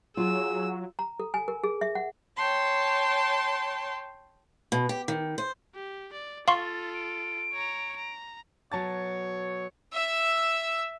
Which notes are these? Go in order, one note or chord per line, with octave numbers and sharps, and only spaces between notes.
F#3 F4 G#4 E6
A#5
A4
G#5
A#4
G#4
E5
F#5
C#5 G5 A5 C6
B2
G4
D#3
C5
G4
D5
F4 A4 F5 C6 C#6 A6
D7
C#5 A#5
A#5
B2 F#3 C#5 A5 A6
E5 E6